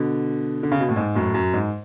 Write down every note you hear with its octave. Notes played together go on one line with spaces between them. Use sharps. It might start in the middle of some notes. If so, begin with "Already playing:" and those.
Already playing: B2 D3
D3
C#3
B2
A2
G#2
F#2 A2
F#2
G#2